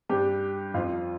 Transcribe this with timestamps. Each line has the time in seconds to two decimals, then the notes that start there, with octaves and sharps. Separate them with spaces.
0.09 G2 G3 G4
0.74 F2 F3 F4